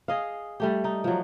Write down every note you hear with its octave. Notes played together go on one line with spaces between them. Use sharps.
G#4 D#5 F5
G3 A3 G4
D#4
F3 F#3